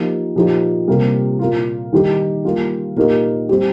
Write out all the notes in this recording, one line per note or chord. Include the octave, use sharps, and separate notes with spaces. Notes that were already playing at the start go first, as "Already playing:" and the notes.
Already playing: F3 A#3 D#4 G4
A#2 F3 D#4 G4
C3 G3 A#3 F4
A#2 A#3 F4
D#3 G3 D#4 G4
G3 A#3 F4
A#2 A#3 D#4 G4
G3 C4 G4